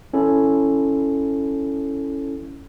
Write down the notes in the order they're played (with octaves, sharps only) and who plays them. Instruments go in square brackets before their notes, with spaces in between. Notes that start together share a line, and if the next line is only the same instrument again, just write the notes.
[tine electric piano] C#4 E4 A4